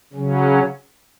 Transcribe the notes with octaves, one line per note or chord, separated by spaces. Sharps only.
C#3 F#3 C#4